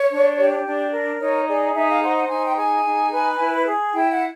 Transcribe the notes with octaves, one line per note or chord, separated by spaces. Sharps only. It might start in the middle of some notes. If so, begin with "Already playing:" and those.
Already playing: C#5
D4
G4
D4
A#4
D#4 C#5
G#4 D5
D#4 E5
F5
C5 F#5
F#5
D#4 G#5
G5
G#4 G#5
D#4
B4
E4
G#4
E4 G5
F#5